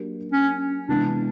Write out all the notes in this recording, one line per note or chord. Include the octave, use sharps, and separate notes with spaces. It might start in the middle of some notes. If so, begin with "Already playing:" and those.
Already playing: F#3 A#3 D4 G4
C#4
C3 E3 G#3 B3 D4